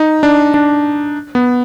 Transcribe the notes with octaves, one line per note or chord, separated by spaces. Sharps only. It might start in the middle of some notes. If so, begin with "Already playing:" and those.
Already playing: D#4
D4
D4
B3